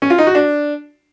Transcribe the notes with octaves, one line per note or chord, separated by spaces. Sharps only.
C#4
F4
D#4
F#4
D4